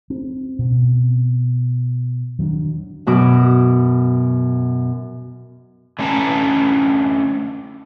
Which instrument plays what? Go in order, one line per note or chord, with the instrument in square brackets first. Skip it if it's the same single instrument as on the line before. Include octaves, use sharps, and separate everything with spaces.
[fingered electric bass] C4
B2
D#3 F#3 C4 D4
[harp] F#2 B2 D6
[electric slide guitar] D3 A3 C#4 B4 A5 A#5